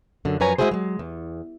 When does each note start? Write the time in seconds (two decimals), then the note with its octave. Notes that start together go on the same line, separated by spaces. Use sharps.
0.25 F#2 D3
0.40 F#2 F3 B4 C#5 G#5 A#5
0.58 G#3 C4 E4 F#4 G#4 C5
0.71 F#3 G#3
0.99 E2